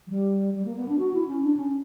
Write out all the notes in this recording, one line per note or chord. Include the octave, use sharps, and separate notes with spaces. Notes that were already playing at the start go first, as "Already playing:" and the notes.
F#3
G3
G3
A#3
B3
D4
F#4
E4
C#4
D4
C#4